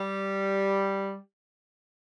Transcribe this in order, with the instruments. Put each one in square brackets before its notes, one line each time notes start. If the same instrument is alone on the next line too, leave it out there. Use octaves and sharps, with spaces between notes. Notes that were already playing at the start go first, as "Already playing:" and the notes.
Already playing: [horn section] G3